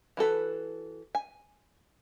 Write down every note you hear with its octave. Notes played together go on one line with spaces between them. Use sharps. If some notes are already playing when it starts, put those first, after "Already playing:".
E3 F#4 A4 B4
G#5